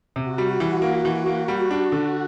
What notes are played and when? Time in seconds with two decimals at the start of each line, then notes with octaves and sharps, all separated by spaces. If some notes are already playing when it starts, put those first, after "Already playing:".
0.16 C3 F#4
0.38 G3
0.60 E3
0.82 A#3
1.05 E3
1.26 A#3
1.48 G3
1.71 D4
1.92 D3